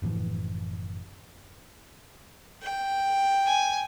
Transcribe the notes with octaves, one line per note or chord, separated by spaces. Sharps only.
F#1 A2 E3 F3
G5
G#5